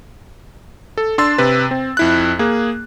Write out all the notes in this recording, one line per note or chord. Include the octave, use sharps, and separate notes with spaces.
A4
D4 C6 E6 A6
C3 B4
C4
F2 E4 F#6
A#3 G#4